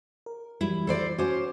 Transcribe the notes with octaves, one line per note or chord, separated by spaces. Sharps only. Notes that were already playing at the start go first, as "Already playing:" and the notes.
A#4
E3 F#3 G3 E4
A4 C5 D5
C#4 F#4 C5 D6